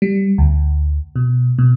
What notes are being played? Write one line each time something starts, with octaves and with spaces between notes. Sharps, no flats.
G3
D2
B2
B2